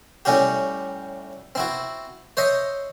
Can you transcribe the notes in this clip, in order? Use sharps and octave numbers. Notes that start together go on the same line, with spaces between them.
A2 G3 C#4 F#4 G4
C4 E4 F#4
C5 C#5 D#5 E5